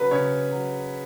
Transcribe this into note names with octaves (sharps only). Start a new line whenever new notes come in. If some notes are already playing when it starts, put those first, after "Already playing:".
Already playing: C#3 F#3 B4
C#3 C#5
F#3